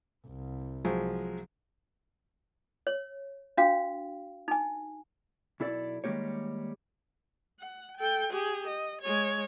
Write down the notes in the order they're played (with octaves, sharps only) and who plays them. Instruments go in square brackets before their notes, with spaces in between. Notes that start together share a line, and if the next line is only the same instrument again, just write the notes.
[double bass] C2
[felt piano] F3 F#3 G#3
[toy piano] C#5
D4 F#4 F5 G5
D#4 G#5
[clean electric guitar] B1 E4 A4 D5
D#3 G3 G#3 A#3 G4 C#5
[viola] F#5
A4 G5
G4 G#4
D#5
G#3 C#5